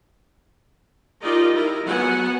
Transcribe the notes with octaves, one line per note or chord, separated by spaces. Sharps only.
D#4 F4 G4 A#4 D5 D#5
E4 A#4
F#3 B3 F#5 G#5